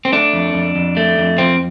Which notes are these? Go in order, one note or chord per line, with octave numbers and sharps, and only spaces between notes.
C4
A3 D4
F2
F2
F2
A3
F2
F3 C4